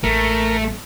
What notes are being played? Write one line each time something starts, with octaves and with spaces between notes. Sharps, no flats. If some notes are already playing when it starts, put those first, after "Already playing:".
A1 E3 A3 A#4